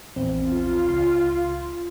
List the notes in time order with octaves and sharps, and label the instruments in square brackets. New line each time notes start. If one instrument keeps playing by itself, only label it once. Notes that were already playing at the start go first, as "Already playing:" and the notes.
[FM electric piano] A#1 E2 C4
[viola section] F4
[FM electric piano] C#2 C6